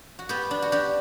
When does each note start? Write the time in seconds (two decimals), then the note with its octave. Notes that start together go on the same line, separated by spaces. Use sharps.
0.19 F#4
0.29 B3 G4
0.51 D4
0.62 F#4
0.72 D4 G4